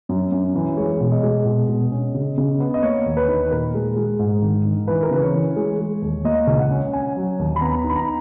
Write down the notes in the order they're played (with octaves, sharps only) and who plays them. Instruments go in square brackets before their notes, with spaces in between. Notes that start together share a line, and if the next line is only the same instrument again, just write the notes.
[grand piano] F#2
F#2
E3
G#3 C#5
B2
D#5
G#3
B2
B2
C#4
C#3
C#3
B3
D#5
A#3 C#5
D#2
B4
D#3
A#2 A#4
G#3
G#3
G#2
D#3
D#3
E3 B4
A#4
C#3 B4
C#5
E3
G#3
G#3
D#2
A#3 D#5
C#2
F#5
C#4
C#4 G#5
F#3
D#2
B5
B3 A#5
D#4
B5
A#5